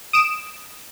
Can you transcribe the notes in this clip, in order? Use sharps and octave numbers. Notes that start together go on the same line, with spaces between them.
D#6 D7 E7